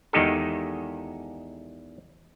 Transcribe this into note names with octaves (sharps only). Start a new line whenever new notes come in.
E2 D#3 G#3 D#4 G4 A4